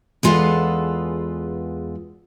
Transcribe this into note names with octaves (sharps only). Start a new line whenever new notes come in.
E2 G#3 F4 A4 B4 F#5